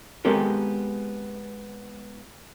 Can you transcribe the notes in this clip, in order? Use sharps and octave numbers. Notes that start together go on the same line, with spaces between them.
G#3 B3 C4 G4 A4 A#4